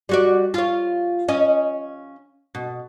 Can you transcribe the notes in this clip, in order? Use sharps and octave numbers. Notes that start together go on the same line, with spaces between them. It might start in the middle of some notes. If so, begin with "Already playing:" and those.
G3 F#4 D5
F4 C#5
C#4 D#5
B2